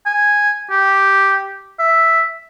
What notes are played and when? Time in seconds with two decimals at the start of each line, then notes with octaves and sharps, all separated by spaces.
0.06 G#5
0.71 G4
1.79 E5